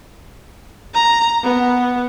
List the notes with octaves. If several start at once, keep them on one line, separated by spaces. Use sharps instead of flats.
A#5
B3